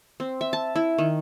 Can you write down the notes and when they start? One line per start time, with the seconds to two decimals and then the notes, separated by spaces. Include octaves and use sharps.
0.20 C4
0.41 E5
0.53 A5
0.76 E4
0.98 D#3